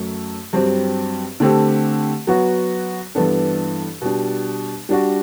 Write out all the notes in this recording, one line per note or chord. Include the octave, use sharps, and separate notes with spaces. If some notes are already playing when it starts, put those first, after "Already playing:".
Already playing: F#2 F#3 A3
G2 F#3 C4 G4
D3 A3 C4 G4
F#3 B3 F#4
G2 E3 B3 D4 A4
B2 G3 D4
G3 D4 F#4